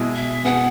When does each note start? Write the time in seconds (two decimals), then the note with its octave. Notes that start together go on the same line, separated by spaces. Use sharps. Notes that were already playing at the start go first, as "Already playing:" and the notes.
Already playing: B2 G#3 E4 G#4
0.15 E5
0.44 B2 B3 G#4 F#5